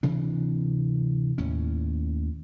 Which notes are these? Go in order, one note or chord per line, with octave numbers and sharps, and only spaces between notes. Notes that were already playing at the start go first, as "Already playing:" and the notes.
D2 C3 E3 D4
D#2 A2 C#4